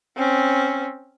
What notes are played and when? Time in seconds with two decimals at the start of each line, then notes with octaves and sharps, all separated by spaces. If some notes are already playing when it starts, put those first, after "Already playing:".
0.17 C4 C#4